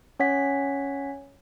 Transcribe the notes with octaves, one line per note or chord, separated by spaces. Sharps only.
C#4 C#5 F#5 B6